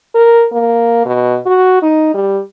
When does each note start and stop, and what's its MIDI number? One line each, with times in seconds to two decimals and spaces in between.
0.15 0.46 70
0.52 1.02 58
1.05 1.37 47
1.46 1.78 66
1.83 2.12 63
2.14 2.40 55